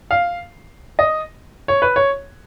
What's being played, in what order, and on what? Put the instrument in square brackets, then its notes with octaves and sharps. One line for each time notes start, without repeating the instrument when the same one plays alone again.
[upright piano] F5
D#5
C#5
B4
C#5